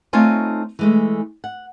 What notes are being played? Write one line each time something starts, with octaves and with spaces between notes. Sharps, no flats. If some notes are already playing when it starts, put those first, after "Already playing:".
A3 C4 D#4 F4 C#5 G#5
E3 G#3 A3
F#5